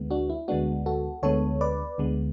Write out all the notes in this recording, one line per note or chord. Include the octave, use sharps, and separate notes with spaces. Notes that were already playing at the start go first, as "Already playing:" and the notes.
Already playing: D2 D3 G#3 B3
D4 F#4
E4
D2 D3 G#3 B3 D4 F#4
F#4 A4
D2 D3 G#3 B3 A4 C#5
B4 D5
D2 D3 G#3 B3